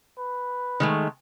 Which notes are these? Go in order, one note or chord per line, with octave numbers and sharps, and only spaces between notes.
B4
D#3 G#3 A3